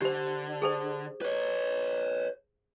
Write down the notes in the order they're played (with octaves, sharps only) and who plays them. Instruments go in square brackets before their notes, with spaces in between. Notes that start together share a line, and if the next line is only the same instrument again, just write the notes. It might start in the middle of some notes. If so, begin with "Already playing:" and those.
[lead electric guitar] D3 [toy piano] G4 C5
[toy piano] G#4 A4 C5
[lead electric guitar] B4 C#5